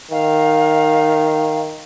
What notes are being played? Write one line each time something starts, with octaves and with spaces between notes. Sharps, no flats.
D#3 F5